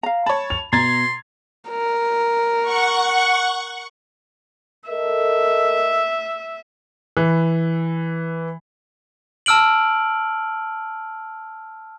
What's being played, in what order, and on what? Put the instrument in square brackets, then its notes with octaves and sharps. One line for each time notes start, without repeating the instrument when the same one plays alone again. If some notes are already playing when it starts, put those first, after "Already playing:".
[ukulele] F5 A#5
[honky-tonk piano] C#5 A5 [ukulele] B5
[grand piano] F7
[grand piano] B2 [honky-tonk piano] A#5 G#6 A6 [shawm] C6
[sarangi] A#4
[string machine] F#5 C#6
[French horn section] A4 A#4 D#5 [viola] E5
[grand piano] E3
[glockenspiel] A5 E6 F6 D7 F#7